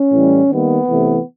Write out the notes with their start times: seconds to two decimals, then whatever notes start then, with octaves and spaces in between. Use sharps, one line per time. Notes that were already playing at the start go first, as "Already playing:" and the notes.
Already playing: C#4
0.11 A2 E3 G3
0.49 D#3 G3 A#3 B3
0.88 C3 E3 A3